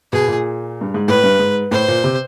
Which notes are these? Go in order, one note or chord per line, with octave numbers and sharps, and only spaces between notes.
B2 G#4
A#2
G2
G#2
A2 B4
G2
G#2
A2 C5
A#2
C3